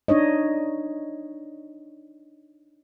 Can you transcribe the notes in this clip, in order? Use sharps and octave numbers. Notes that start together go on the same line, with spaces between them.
D4 D#4 C#5 D#5